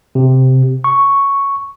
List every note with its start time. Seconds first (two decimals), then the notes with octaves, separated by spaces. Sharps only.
0.15 C3
0.84 C#6